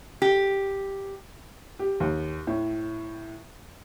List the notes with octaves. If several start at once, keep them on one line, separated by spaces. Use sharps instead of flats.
G4
G4
D#2
A2